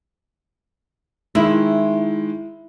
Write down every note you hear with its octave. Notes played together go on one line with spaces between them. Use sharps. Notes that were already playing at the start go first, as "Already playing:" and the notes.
D#3 G#3 E4